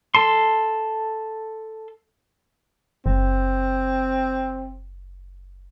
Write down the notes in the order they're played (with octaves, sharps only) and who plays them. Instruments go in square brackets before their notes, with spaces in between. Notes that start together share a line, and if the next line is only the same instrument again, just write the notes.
[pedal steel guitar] A4 A5 C6
[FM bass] F#1 [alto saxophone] C4